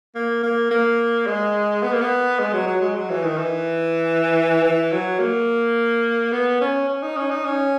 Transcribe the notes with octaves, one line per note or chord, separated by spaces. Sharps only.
A#3
A#3
A#3
G#3
B3
A#3
B3
G#3
F#3
F#3
G#3
F#3
E3
D#3
E3
E3
F#3
A#3
B3
C#4
C#4
D#4
C#4
D#4
C#4